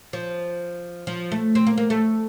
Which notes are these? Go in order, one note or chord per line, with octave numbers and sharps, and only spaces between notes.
F3
F3
A3
C4
A#3
A#3
A3